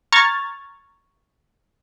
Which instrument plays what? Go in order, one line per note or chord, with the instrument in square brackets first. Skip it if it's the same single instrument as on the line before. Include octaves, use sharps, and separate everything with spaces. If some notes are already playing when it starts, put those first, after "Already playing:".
[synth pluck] A#5 C#6 F6 G#6 A6